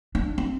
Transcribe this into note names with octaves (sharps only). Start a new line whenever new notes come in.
D4
C4